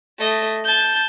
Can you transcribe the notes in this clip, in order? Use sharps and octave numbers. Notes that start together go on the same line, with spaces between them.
A3 D#5
A5 G6